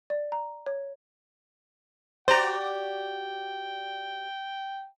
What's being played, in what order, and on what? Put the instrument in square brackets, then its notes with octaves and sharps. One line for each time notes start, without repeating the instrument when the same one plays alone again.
[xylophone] D5
A#5
C#5
[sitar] F#4 G4 D5 [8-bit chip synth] C5 A#5 [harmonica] G5